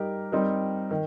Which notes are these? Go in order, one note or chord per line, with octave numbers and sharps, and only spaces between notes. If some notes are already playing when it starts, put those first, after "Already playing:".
Already playing: G3 D#4 G4 A#4
G3 C4 D#4 A#4
D#3